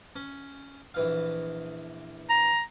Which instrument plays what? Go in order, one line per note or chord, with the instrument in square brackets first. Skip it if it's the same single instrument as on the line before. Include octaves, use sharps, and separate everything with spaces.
[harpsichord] C#4
A#1 E3 F5
[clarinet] A#5